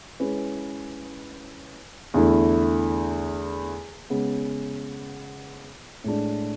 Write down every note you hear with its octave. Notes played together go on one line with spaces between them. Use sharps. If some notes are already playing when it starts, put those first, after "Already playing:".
G#3 C#4 E4 B4
E2 D3 A3 E4
C#3 G#3 B3
A2 G#3 D4